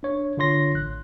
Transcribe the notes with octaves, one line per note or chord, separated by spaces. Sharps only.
D4 C#5
D3 D4 F4 C#5 C6 A#6
A1 F#6